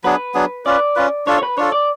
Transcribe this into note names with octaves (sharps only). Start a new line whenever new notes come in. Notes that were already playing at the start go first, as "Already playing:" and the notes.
F#3 B3 D4 G#4 B4
F#3 B3 D4 G#4
C#4 F4 B4 D5
C#4 F4 B4
D4 F4 A4 C#5
C#5
B4
D4 F4 A4 C#5
D5